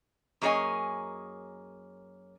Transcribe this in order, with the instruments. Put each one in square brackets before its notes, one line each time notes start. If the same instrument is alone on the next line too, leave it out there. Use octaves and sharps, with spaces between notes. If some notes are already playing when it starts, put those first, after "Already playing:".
[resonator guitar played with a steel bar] F#2 A#3 G#4 C#5 D#5 G#5